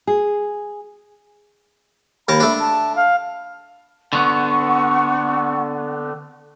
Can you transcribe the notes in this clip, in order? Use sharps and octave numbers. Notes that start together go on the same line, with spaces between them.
G#4
D#2 A#4 A5 B5
A3 D4
A5
F5
D3 B3 F#5 C#6